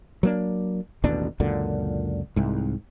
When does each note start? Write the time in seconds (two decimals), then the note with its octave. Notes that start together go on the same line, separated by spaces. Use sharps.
0.23 F#3 A#3 D4
1.04 A1 D#2 B2 D4
1.40 C#2 F#2 A#2 D3
2.36 C2 G#2